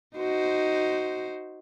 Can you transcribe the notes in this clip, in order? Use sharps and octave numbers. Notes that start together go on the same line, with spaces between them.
D#4 F#4 C5